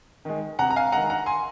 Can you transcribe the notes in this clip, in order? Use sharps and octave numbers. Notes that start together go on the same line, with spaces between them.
D#3 G#3
C3 F#5 A#5
A#5
F5 G#5
D#3 G#3 F#5 A#5
F#5 A#5
G#5 C6